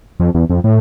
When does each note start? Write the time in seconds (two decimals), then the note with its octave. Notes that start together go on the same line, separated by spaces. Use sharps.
0.20 F2
0.35 E2
0.50 F2
0.64 A2